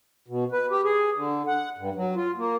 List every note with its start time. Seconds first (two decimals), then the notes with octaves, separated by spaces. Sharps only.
0.28 B2
0.52 B4
0.70 G4
0.84 G#4
1.14 D3
1.47 F#5
1.78 G2
1.95 F#3
2.16 F4
2.37 A#3